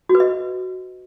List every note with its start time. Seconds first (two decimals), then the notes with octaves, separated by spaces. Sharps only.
0.09 F#4
0.15 B4
0.20 D#5